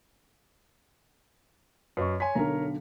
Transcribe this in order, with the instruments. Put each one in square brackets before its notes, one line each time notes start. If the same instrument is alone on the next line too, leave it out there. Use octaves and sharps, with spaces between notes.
[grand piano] F#2 [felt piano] B4 D#5 C#6
[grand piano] C#5 G#5 [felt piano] C6 B6
[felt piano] B1 D3 [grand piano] A#4 C#5 A#5